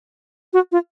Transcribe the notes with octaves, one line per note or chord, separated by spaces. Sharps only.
F#4
F4